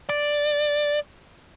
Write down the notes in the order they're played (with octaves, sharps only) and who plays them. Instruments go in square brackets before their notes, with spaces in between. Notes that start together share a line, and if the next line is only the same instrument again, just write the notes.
[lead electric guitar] D5